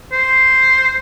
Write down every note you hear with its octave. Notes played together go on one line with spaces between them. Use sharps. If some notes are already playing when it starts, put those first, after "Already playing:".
C5